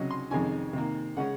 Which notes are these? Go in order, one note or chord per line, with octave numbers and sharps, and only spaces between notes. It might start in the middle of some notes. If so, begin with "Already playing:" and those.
Already playing: C#2 C3 F#3 C#4 D#5
C6
F2 C3 D#3 G#3 C#4 G#5
C3 D#3 A#3
C#3 G#3 C#4 F#5